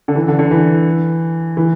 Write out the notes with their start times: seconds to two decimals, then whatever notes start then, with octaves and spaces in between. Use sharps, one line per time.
0.08 D3
0.15 E3
0.28 D3
0.39 D3
0.51 E3
1.57 E3